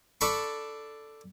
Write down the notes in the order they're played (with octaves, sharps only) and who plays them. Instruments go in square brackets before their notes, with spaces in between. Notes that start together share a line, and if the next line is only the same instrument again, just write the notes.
[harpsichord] D4 A4 B5 C#6